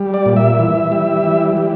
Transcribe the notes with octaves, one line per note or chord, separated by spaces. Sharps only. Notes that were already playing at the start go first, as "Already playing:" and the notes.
Already playing: G3
D5
A#2
E5
E3
G3
E3
G3